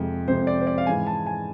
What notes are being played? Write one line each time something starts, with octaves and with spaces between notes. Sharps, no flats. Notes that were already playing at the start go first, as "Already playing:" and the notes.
Already playing: F2 C3 G#3
F2 C3 G#3 C5
D5
C5
D5
F5
G#2 E3 G#3 G#5
A5
G#5